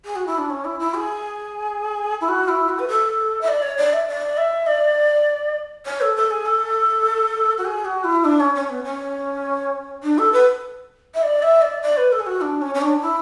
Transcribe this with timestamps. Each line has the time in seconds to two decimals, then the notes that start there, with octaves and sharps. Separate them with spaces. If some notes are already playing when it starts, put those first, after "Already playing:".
0.05 G#4
0.16 F#4
0.26 E4
0.38 D4
0.50 C#4
0.65 E4
0.79 E4
0.94 G#4
2.21 E4
2.29 F#4
2.48 E4
2.69 F#4
2.79 B4
2.88 A4
3.41 E5
3.48 D5
3.62 C#5
3.77 D5
3.93 E5
4.08 D5
4.37 E5
4.67 D5
5.86 C#5
6.01 A4
6.16 A4
6.31 G#4
6.46 A4
7.58 F#4
7.65 G#4
7.85 F#4
8.04 E4
8.24 D4
8.40 C#4
8.55 C#4
8.70 B3
8.84 C#4
10.03 D4
10.18 A4
10.33 B4
11.14 E5
11.23 D5
11.42 E5
11.62 D5
11.82 D5
11.97 B4
12.12 A4
12.20 G#4
12.26 F#4
12.41 D4
12.61 C#4
12.74 C#4
12.82 D4
13.01 E4